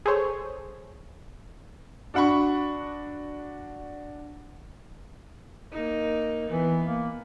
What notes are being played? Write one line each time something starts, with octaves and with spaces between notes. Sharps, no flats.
G#4 A4 C5 C#5
D4 F#4 F#5 B5 C#6
A#3 D#4
E3 B3
A#3